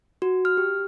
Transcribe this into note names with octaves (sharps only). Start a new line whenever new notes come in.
F#4
F6
G4